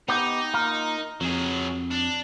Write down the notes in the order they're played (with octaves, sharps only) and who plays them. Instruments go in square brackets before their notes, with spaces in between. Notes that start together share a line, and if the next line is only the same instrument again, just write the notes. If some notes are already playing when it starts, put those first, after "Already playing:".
[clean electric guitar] B3 G4 [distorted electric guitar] D#4
[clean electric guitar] A#3 F4 A#4
[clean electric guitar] F2 [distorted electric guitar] F#3 G#4
[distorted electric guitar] D4